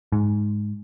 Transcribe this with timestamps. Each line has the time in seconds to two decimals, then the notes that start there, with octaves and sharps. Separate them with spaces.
0.12 G#2